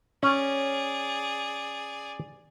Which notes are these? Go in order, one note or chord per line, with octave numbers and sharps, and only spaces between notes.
C#4 G#4 D5